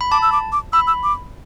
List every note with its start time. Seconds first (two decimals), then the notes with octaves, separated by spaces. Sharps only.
0.01 B5
0.11 A5 D6
0.22 E6
0.32 D6
0.52 D6
0.73 B5 E6
0.87 E6
1.03 D6